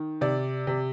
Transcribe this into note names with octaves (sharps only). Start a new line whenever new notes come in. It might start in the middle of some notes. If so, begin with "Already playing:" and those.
Already playing: D#3
C3 D5
C3